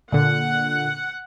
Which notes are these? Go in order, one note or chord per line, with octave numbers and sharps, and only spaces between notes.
A#2 D3 F#5